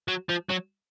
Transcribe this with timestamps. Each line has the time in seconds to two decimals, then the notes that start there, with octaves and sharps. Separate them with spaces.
0.08 F#3
0.29 F3
0.49 F#3